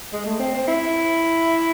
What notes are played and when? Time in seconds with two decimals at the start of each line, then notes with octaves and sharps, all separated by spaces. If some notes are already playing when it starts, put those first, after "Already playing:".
0.13 G#3
0.26 A3
0.39 C4
0.54 C4
0.68 E4